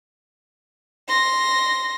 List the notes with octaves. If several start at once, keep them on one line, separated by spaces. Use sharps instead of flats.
C6 A#6